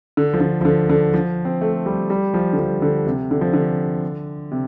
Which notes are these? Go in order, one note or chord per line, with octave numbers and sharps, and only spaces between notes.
D3
F3
D3
F3
D3
D3
F3
C4
A3
G3
G3
F3
D3
F3
D3
C3
D3
F3
D3
C3